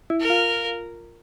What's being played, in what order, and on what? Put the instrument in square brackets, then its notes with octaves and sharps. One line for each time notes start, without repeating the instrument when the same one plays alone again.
[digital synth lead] E4
[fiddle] A#4
[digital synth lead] F4